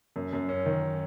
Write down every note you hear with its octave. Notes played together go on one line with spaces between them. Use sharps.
F#2
F#2
C#4
D#3